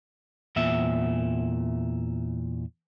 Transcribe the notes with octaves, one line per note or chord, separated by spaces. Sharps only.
E2 A#2 E5